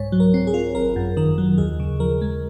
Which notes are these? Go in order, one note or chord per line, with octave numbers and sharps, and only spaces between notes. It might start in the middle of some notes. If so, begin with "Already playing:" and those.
Already playing: C2 G#2 C#5
F#3
A#4
C4
G#4
F4
G#1 A#4
F#2
D#3 A#4
F#3
D#2 G#4
C#3
F3 A#4
G#3